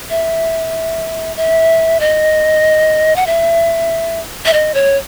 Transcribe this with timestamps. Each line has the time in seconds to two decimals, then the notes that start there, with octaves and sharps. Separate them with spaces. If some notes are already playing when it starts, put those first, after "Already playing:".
0.10 E5
1.37 E5
2.00 D#5
3.16 F#5
3.26 E5
4.46 E5
4.53 D#5
4.74 C#5